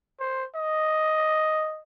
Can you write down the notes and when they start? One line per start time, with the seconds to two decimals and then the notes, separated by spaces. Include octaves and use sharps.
0.20 C5
0.55 D#5